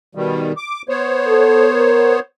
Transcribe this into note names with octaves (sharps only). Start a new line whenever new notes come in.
B2 D#3 G3
D6
B3 C5 C#5
A4
A#4